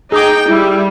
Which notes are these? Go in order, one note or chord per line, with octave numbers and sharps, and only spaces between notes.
D#4 G#4 G5 D6
G3 E4